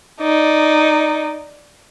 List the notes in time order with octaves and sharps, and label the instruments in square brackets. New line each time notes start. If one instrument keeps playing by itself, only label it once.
[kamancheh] D#4 D5